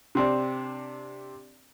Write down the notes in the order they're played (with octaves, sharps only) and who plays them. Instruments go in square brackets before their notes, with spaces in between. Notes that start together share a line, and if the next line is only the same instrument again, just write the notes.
[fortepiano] C3 C4 D4